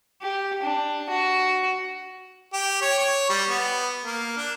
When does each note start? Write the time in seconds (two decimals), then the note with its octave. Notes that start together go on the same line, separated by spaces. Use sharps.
0.22 G4
0.63 D4
1.09 F#4
2.53 G4
2.81 C#5
2.99 C#5
3.29 G3
3.49 B3
4.05 A#3
4.37 D4